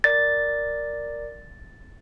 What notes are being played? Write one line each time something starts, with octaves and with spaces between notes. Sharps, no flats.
A#4 D5 A6